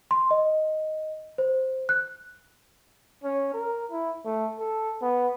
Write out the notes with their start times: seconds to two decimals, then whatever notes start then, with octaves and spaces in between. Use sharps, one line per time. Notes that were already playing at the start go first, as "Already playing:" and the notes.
0.11 C6
0.31 D#5
1.38 C5
1.89 F#6
3.23 C#4
3.54 A#4
3.91 E4
4.25 A3
4.59 A4
5.02 B3